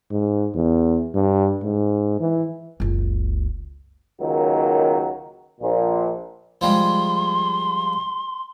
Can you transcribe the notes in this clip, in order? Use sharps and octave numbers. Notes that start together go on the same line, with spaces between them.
G#2
E2
G2
G#2
E3
F#1 C#2
C#2 D#3 F#3 A#3
A#1 A#2
F3 G3 G#3 C6